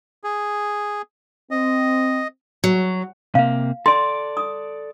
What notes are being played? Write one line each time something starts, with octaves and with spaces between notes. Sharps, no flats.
G#4
C4 D#5
F#3
C3 A#3 F5
A4 D5 C6
D#6